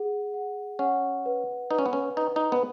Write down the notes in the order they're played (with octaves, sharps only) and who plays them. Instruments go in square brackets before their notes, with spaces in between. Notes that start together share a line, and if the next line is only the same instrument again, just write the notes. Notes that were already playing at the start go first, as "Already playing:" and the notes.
Already playing: [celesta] G#4 F#5
F#5
[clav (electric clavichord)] C#4 [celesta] F#5
[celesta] B4
[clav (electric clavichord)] D#4 [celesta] B4
[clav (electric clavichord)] C#4
B3
C#4
[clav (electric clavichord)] D#4 [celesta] B4
[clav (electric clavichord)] D#4
B3